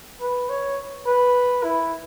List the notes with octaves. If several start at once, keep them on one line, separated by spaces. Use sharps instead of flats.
B4
C#5
B4
E4